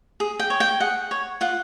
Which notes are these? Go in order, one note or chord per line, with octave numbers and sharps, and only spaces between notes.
G#4
G5
C#5
G5
G#4 F#5
C#5
F4 F#5